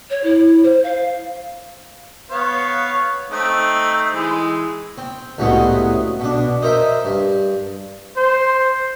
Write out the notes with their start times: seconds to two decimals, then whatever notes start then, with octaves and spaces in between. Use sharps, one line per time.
0.10 C#5
0.24 E4
0.63 C5
0.83 F5
2.31 B3 C#5 F5
3.31 A3 C4 D#4
4.13 E3 G#3
4.98 C4
5.38 C2 A2 C#3 F#3 G#3 B3
6.20 B2 D4
6.62 D#4 A#4 C5 E5
7.05 G2
8.17 C5